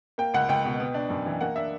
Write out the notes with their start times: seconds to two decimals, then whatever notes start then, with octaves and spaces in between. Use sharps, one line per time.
0.18 A#3 G5
0.34 C#2 F#5
0.49 C#2 G5
0.65 B2
0.80 B3
0.94 D4
1.10 F#2
1.26 E3
1.41 A#3 F#5
1.56 D4 E5